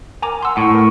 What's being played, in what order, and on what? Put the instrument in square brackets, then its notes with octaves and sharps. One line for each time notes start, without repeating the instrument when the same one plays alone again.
[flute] A#4 [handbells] G#5 A#5 D6
[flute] F#5 [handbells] C6 E6
[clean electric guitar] A2 [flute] C#6
[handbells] A#4